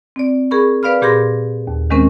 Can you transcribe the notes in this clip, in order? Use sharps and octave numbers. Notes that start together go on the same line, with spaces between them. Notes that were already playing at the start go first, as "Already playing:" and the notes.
C4 D5
G#4 A#4 B5 C#6
B4 D5 F5 B5 F6
A#2 G4 G#4 B5 C6 A#6
D#2
D#3 G#3 C4 C#4 A#4 C5